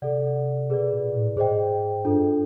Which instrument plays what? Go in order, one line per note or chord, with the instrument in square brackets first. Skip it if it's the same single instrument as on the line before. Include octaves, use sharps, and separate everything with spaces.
[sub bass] C3 [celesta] A4 D5 F#5
[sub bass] B2 [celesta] G#4 B4 D5
[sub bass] A#2
A2
[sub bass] G#2 [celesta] G#4 C5 D#5 G5
[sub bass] G2 [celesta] D4 F4 A4